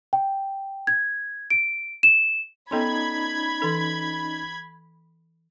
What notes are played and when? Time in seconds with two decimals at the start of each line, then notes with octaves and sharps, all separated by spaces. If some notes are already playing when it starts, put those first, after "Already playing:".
0.13 G5
0.87 G#6
1.50 D7
2.03 E7
2.71 B3 C#4 D#4 A4 B5 C6 G#6
3.62 E3 A4